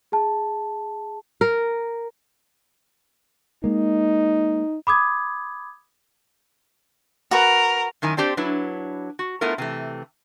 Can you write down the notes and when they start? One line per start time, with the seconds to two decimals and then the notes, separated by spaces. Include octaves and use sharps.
0.12 G#4 A5
1.41 A#4
3.64 G#3 A#3 D#4
4.87 B5 D6 D#6 G#6
7.31 F#4 A#4 B4
8.02 F#2 D#3 E4 G#5
8.17 C4 D4 G4 C5 D5
8.37 F#3 D4 E4 B4
9.19 F#4
9.41 A3 B3 E4 F4 A#4
9.58 C3 E3 A3